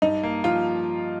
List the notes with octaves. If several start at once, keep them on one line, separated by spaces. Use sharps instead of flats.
G2 D#4
A#3
F3 F4